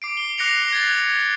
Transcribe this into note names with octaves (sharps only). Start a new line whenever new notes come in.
D6 C7 D7
G7
D6 F#6 A#6 C7 C#7 F7
G#6 A6 C7